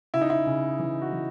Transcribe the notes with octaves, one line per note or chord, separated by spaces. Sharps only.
C#3 E4
D#4
E4
C#3
E3
F#4
E3